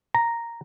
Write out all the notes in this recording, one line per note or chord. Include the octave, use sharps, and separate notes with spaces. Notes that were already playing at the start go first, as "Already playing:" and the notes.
A#5